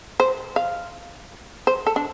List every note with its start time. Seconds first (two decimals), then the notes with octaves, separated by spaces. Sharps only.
0.20 C5
0.56 F5
1.67 C5
1.87 A4
1.96 D4